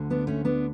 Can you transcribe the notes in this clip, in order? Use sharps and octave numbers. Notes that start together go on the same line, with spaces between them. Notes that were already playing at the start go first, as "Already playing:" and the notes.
Already playing: D2 D3
B3 D4
A3 C#4
B3 D4